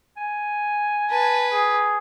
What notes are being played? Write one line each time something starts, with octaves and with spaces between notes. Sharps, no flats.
G#5
B4 A5
G#4